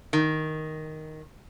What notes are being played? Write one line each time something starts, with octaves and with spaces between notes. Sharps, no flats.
D#3